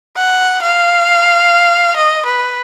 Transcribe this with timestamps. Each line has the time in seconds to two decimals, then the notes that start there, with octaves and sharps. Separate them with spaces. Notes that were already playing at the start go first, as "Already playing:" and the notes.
0.17 F#5
0.62 F5
1.96 D#5
2.26 B4